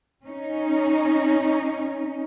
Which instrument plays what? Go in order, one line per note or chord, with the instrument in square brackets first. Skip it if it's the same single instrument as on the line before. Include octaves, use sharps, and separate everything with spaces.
[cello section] C#4 D#4